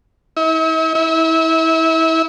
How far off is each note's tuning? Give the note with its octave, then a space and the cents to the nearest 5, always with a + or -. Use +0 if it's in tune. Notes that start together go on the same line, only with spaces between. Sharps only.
E4 -45
E4 -30